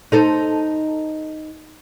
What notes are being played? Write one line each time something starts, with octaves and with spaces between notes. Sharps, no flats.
D#4 A4 C5